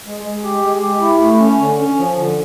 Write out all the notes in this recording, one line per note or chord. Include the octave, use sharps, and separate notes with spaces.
G#3
G#3
G4
G#3
G4
E4
A3
C#4
D3
C#4
F3
D3